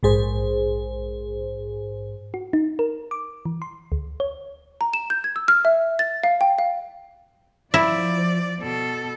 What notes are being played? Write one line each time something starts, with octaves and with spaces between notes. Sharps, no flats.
A#1 G#2 G#4 C5
F#4
D#4
A#4
D6
E3
C6
D2
C#5
A#5
E7
G6
G#6
E6
F6
E5
A6
F5
G5
F5
F3 E4 D5
B2 A4